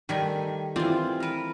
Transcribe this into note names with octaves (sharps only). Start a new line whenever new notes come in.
D#3 G3 A3 G#5
E3 C4 F4 D5
A#4 B4